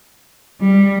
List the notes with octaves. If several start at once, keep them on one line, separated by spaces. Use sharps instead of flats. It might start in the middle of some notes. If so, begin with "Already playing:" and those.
G3